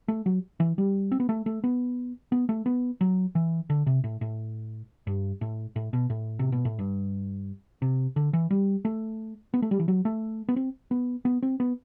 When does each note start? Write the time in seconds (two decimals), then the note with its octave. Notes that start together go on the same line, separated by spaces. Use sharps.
0.08 A3
0.26 F#3
0.60 E3
0.78 G3
1.12 C4
1.20 B3
1.29 A3
1.46 A3
1.64 B3
2.32 B3
2.49 A3
2.66 B3
3.01 F#3
3.35 E3
3.70 D3
3.87 C3
4.04 A2
4.21 A2
5.07 G2
5.41 A2
5.76 A2
5.93 B2
6.10 A2
6.39 C3
6.52 B2
6.65 A2
6.79 G2
7.82 C3
8.16 D3
8.33 E3
8.51 G3
8.85 A3
9.54 B3
9.62 A3
9.71 G3
9.79 E3
9.88 F#3
10.05 A3
10.49 B3
10.56 C4
10.91 B3
11.25 B3
11.42 C4
11.60 B3